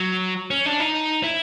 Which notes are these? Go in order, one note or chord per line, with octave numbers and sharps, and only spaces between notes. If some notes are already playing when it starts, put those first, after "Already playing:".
Already playing: F#3
C#4
D4
D#4
E4